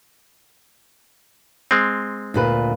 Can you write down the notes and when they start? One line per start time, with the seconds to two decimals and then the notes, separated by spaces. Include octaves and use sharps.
1.71 G#3 C4
2.34 D2 A#2 B4